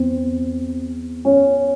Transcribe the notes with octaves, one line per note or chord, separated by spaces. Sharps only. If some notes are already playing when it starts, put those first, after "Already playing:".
Already playing: E2 C4
C#4